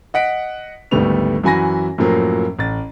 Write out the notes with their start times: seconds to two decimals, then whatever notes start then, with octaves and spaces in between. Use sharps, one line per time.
0.14 D#5 F#5 B6 D7
0.91 G#1 D2 G3 A3 B3 F7
1.43 F#2 E3 F#4 G#5 B5 A#6
1.98 F#2 A2 F3 F#3 A#3
2.59 A1 A6